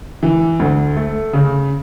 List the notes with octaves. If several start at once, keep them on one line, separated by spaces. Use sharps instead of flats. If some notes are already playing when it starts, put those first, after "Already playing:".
E3
D2
A3
C#3